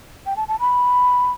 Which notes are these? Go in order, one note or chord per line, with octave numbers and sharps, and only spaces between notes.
G5
A5
A5
B5